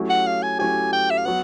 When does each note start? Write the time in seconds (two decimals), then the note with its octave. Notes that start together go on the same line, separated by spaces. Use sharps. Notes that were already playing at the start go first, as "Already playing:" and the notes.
Already playing: F#3 A3 C#4 E4 G4
0.10 F#5
0.26 F5
0.43 G#5
0.59 F#3 A3 C#4 E4 G4 G#5
0.93 G5
1.11 E5
1.18 F5
1.25 F#3 B3 F#5